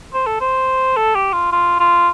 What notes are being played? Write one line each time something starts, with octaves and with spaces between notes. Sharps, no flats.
C5
A4
C5
A4
G4
F4
F4
F4